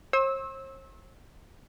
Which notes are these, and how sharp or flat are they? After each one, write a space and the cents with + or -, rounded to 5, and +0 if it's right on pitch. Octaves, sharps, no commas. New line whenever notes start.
C5 +45 E6 -20